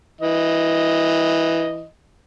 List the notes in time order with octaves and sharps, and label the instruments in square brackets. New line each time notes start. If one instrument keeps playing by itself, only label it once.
[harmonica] E3 D#5